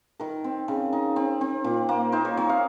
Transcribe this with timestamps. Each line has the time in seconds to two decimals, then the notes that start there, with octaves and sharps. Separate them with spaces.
0.20 D#3 A#4
0.44 C4
0.68 C#3
0.93 D#4
1.16 C4
1.41 C4
1.64 A#2
1.89 A#3
2.12 D#4 C5
2.25 C#5
2.37 C4 C#5
2.49 F5